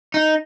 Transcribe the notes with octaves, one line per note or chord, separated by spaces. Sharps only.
D#4